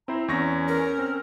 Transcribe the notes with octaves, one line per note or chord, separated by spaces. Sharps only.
C4 E4 C5 A#5
E2 C#4 C#6 A#6
A#4
C4 F6